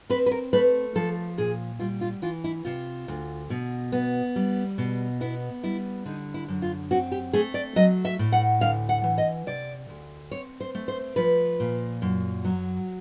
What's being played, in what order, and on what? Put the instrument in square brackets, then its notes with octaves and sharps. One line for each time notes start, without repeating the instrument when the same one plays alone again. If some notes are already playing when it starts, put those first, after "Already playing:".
[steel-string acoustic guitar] C4 B4
B4
A#4
A3 B4
F3 A4
A#2 G#4
G3 F4
F4
E3 F4
E4
C3 F4
D2
B2
B3
G3
B2
B3 E4
G3 E4
D3 D#4
E4
F#2
F4
C4 F#4
G4
A3 G#4
D5
F#3 D#5
E5
A2
F#5
D2 F5
F#5
E3
D#5
C3 D5
D2
C4 C#5
C5
A3
C5
F3 B4
A#2
F#2
F#3